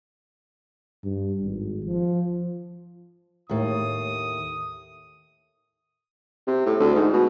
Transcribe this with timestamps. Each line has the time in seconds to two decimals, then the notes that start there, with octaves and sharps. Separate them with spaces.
1.04 G2
1.42 G#1
1.85 F3
3.50 D#2 A2 D#6
6.47 C3
6.66 A2
6.80 D2
6.95 G#2
7.13 B2